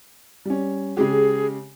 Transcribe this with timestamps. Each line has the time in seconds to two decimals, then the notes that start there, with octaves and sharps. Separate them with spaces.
0.45 G3 C#4
0.97 C#3 G#3 G4 G#4